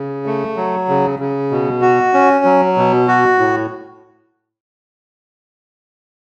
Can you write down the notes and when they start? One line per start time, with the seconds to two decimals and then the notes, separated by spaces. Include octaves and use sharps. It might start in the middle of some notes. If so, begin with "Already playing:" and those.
Already playing: C#3
0.26 A3
0.56 F#3
0.89 C#3
1.19 C#3
1.51 B2
1.82 F#4
2.14 C#4
2.45 F#3
2.77 B2
3.08 F#4
3.38 A2